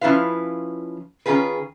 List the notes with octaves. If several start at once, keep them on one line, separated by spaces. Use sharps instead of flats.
F3 C#4 E4 B4 F5
D#3 C#4 F4 G#4 B4